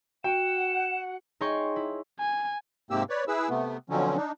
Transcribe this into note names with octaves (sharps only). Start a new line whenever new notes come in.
F#4 F#5 G5 E7
D#4 G#4 C#5 G5 C6 C#6
E4
G#5
G#2 C3 A#3 C4 G4 E6
B4 C#5 D5
E4 G#4 B4 E6
C3 A3 B3
B2 D3 F3 F#3 C4 C#4
D4 D#4